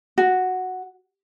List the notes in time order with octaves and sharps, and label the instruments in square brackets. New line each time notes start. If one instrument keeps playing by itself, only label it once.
[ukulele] F#4